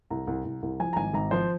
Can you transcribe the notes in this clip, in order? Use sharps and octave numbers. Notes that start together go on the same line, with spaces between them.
C2 A#5
C2
C2
C2
F3 G#5
A#5
G#1 G#5
G#1 A#5
F3 C5